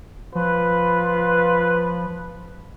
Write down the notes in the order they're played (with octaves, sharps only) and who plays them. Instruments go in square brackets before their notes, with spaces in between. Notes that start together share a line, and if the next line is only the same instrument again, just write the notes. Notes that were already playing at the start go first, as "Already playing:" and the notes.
[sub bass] F3 [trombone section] F4 B4